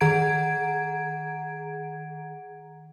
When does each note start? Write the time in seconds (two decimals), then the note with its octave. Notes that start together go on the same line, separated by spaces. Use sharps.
0.01 D#3 G#4 F#5 A#5 G#6 D7